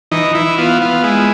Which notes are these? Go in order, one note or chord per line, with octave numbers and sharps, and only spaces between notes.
E3 D#4
E3 E4
B3 F4
B3 F4
G#3 E4